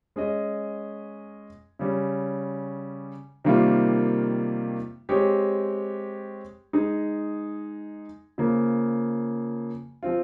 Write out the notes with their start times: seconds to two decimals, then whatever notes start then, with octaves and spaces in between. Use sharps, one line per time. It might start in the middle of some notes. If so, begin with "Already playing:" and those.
0.16 G#3 C#4 G#4 D#5
1.79 C#3 G3 C#4
3.45 C3 D#3 G3 A#3 F4
5.09 G#3 C4 G4 C#5
6.73 G#3 D#4 G#4
8.38 C#3 F3 A#3
10.03 F3 C4 F4